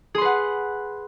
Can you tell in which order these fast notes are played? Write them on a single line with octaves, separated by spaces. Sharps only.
G#4 C6 B4 F#5